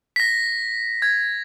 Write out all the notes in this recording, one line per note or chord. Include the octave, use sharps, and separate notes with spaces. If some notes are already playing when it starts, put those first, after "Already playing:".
B6
A#6
G#6